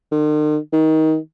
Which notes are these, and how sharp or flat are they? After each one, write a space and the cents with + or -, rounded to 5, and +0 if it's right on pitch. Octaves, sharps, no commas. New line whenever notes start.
D#3 -45
D#3 +20